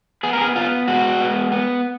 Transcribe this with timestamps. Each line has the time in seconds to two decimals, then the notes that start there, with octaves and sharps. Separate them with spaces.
0.23 B3 G#4
0.33 A#4
0.41 G#4
0.56 B3 F4
0.88 G#3 F#4
1.20 B3
1.52 B3